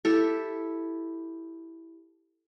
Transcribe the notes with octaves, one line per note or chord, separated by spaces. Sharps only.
E4 G4 A4